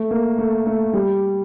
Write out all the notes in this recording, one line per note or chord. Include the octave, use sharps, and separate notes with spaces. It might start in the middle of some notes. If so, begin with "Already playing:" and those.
Already playing: A3
A#3
A3
A3
G3